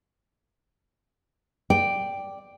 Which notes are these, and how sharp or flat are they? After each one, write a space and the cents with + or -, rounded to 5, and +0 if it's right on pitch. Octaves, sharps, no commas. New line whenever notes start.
D5 +0 G5 +0